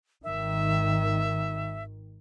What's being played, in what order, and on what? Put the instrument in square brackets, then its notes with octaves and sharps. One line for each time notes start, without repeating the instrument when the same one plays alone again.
[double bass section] G#1 D#3 [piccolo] E5